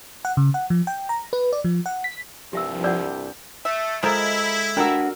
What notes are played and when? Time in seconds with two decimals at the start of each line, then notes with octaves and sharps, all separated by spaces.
0.25 F#5
0.37 C#3
0.54 F#5
0.70 F3
0.87 G5
1.09 A#5
1.33 B4
1.53 D5
1.64 F3
1.86 F#5
2.04 B6
2.53 C2 G2 F3 G4 E5 E6
2.84 G4 D5 F#5 E6 G6
3.65 A3 E5
4.03 F3 G#3 E4 A4 A#4
4.77 D4 F#4 G4 A4 A#4 A#5 E6